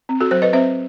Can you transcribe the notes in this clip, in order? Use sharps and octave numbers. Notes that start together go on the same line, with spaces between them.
C4
F#4 A4
F#3 A4 C5
B4 D#5
C4 C5 E5